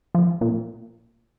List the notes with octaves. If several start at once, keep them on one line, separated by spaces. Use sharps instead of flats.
F3
A#2